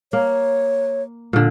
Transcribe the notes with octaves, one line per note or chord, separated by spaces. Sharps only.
A#3 C#5
A#2 D3